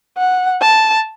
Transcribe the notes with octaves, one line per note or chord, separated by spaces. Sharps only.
F#5
A5